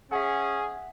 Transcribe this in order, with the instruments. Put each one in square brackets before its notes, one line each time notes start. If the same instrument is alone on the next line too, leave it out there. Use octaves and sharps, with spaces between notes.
[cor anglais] C#4 [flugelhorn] G#4 [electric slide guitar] E5 F#5